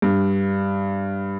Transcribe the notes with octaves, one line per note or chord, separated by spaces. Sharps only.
G2